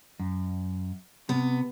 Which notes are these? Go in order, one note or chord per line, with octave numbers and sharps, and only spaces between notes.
F#2
C3 B3